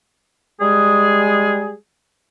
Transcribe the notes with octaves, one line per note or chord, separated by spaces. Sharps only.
G3 G#3 G#4